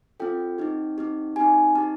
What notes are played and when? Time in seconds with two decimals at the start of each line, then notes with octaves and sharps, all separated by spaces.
0.20 C4 F4 A4 G5
0.58 C4 D#4 G4
0.98 C4 D#4 G4
1.36 C4 D#4 G4 G#5
1.75 C4 D#4 G4 A5